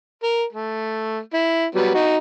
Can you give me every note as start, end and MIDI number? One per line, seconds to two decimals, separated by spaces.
0.23 0.45 70
0.53 1.19 57
1.34 1.65 64
1.75 1.93 54
1.75 1.93 55
1.75 1.93 59
1.94 2.17 63
1.94 2.17 66